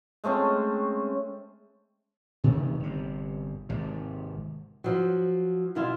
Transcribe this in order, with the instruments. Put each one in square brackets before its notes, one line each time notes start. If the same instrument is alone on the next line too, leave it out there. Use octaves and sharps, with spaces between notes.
[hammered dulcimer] G#3 A3 C4 C#4
[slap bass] C3 D#3 E3 A3
G1 C3
G#1 C3
[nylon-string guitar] F3 F#3
B2 E4 F4 E5